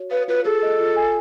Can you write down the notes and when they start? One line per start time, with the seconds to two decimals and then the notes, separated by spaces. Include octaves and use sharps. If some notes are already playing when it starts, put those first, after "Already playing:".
Already playing: F#4 C#5
0.11 B4 F5
0.28 F4 B4
0.45 G#4 A4
0.63 D#5
0.80 F4
0.96 G#5